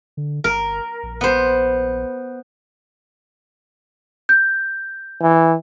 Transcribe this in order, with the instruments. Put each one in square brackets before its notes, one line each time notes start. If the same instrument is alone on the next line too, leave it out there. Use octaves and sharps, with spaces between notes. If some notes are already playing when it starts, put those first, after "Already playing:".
[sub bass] D3
[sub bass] G1 [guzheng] A#4
[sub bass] A#1
[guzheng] B3 C5
[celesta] G6
[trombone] E3